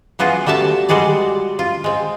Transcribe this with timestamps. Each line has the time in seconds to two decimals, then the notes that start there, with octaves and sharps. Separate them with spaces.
0.19 E3 B3 F4 F#4 G#4
0.46 G3 A3 F#4 E5 A5
0.89 G3 G#3 F#4 G#4 D5
1.59 F4
1.84 G#3 C4